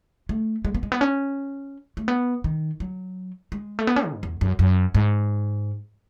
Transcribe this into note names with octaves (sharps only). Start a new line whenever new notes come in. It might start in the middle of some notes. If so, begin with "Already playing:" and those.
A3
G#3
B3
G#3
B3
C#4
A3
B3
D#3
F#3
G#3
A3
B3
C#4
D#3
G#2
E2
F#2
F#2
G#2